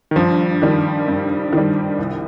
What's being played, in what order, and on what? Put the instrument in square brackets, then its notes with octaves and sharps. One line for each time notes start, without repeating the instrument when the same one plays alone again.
[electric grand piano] D#3
[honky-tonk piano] G2 [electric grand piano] F3
[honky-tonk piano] D#3 G3
G2
D#3 G3
C2